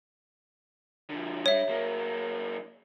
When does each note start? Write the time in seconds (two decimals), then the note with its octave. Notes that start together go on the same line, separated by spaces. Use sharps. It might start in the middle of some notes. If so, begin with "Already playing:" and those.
1.10 D3 F3
1.46 G2 G3 C#5 E5
1.69 F#3 A#3